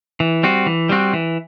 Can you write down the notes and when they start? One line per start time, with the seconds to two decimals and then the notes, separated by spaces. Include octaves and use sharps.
0.20 E3
0.43 G3 C4 F#4
0.66 E3
0.89 G3 C4 F#4
1.14 E3